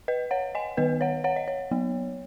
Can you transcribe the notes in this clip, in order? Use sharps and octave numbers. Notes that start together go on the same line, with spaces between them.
B4 D#5
C#5 F#5
D#5 G#5
D#3 B3 B4 D#5
C#5 F#5
C#5 F#5
D#5
C#5
F#3 B3